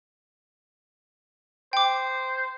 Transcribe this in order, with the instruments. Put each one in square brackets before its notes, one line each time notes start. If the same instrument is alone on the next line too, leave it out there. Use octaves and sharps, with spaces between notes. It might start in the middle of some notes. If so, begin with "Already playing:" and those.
[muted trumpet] C5 [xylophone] G5 D6